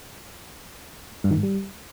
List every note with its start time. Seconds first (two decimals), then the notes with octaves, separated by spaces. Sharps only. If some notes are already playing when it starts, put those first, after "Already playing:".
1.24 G2
1.31 D#3
1.37 G#2
1.43 G3